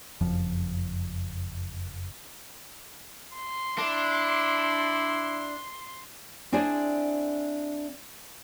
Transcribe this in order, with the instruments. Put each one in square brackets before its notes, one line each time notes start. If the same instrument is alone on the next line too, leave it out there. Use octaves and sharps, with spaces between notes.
[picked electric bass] F#1 F2 F3
[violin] C6
[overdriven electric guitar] D4 [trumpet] E4
[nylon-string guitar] C4 D4 E4 G#4 C5 D5